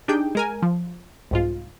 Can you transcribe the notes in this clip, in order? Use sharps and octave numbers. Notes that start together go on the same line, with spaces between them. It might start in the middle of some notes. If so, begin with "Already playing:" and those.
D4 D#4 G4 G#4 G5
G#3 A#4 G#5
F3
C2 G#2 F4